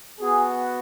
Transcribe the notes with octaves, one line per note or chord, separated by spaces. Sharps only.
B3 F#4 G#4